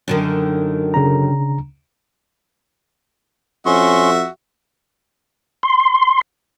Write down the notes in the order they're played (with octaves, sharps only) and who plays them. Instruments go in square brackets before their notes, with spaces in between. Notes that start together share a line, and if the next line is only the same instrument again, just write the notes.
[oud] F#2 D3 D#3
[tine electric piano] C#3 D4 A#5
[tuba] F2 [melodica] C#4 C6 C#6 [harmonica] F#4 E5
[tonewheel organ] C6